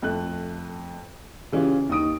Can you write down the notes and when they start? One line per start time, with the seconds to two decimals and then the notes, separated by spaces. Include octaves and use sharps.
0.02 F2 A3 F#6
1.52 C#3 E3 C#4 F4 G4
1.89 D#2 D#4 D#6 D7